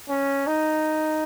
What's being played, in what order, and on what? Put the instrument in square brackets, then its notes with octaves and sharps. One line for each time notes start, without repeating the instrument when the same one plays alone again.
[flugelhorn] C#4
D#4